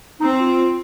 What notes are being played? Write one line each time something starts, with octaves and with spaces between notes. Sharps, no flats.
C4 D#4
F4